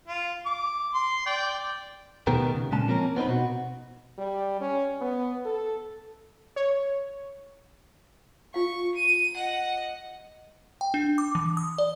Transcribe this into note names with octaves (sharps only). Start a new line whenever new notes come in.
F4
D6
C6
D5 G5
B2 D#3 A3 B3 G4 A#4
C#3
A#2 G#3 C#4 A5
F3 A#3 C4 C#4 A#4
B3 C4 D#4 B4
B2 F#4
G3
C#4
B3
A4
C#5
F4 F5 C#6
D#7
D#5 F#5
G5
D4
D6
E3
D#6
D5